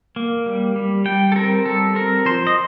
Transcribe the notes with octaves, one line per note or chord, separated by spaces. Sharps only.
A#3
G3
G3
G3 G5
A4
C4 A#4
G3 A4
C4 A#4
F3 C5
D#5